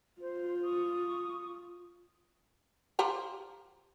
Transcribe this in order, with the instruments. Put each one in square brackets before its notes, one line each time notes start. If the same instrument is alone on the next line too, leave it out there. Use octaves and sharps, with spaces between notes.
[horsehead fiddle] F4 [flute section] C5
[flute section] C#6 D#6
[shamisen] F3 G4 A#5